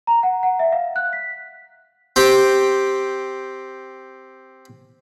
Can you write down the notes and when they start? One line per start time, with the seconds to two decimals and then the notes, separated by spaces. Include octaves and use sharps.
0.07 A#5
0.23 F#5
0.43 F#5
0.59 E5
0.72 F5
0.96 F#6
1.13 B6
2.16 C4 G4